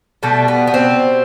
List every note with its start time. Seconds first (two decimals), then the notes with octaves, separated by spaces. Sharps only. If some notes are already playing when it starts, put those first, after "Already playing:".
0.23 B2 G3 A3
0.48 B3
0.67 B3
0.74 C4